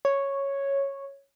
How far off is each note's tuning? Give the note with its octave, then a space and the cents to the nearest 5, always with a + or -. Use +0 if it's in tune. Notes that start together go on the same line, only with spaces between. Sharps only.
C#5 -5